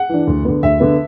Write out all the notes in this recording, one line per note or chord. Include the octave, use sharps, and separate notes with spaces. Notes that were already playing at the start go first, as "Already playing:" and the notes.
Already playing: F#5
E3 D4
D2
D3 B3
D2 E5
D3 B3